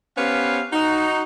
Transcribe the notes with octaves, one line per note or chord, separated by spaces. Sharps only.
B3 C#4 G4 B4 C5 F5
D#4 F#4